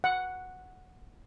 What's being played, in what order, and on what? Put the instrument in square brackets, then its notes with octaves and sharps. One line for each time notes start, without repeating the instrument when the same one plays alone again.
[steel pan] F#5